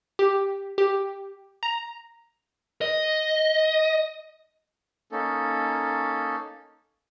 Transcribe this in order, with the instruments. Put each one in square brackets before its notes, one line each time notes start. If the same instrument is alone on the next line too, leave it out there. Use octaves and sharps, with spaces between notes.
[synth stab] G4
G4
A#5
[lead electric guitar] D#5
[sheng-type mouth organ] A#3 C#4 D#4 A4